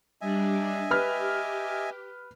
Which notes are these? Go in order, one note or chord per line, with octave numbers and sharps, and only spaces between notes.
G3 D4 D#5 E5 G#5
G4 B4 F6